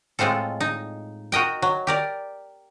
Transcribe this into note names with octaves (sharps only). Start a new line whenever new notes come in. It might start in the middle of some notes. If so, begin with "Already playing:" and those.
A2 G#3 C4 F4 A4
D#4
F#4 A#4 D#5 G5
F#3
G4 A#4 D5